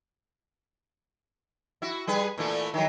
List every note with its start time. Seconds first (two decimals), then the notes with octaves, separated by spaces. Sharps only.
1.82 E4 F#4
2.07 G3 G#4 B4
2.38 A#2 E3 A3
2.74 D#3 F#3